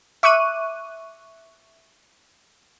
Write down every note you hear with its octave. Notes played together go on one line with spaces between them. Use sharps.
E5 C#6 D6 F#6 D#7